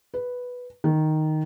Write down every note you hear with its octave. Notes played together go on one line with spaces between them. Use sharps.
B4
D#3